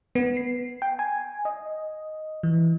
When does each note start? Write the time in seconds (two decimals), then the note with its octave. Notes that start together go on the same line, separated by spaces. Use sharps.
0.15 B3
0.37 C7
0.82 G5
0.99 G#5
1.45 D#5
2.43 E3